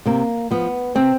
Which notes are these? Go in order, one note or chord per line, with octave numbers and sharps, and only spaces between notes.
C3 A#3
F3 B3
C3 C4